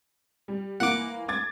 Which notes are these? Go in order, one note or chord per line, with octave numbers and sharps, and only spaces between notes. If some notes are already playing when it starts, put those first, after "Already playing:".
G3
E3 A#3 F#5 D6
D6 G#6 A6